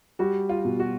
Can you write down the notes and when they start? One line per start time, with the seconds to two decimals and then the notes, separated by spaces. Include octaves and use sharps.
0.19 G3 F#4
0.49 F4
0.65 B2
0.79 F#4